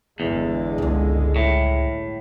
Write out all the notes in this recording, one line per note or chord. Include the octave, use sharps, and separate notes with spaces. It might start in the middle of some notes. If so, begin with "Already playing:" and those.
G1 E2 D3 G#3
C#2 E4
A2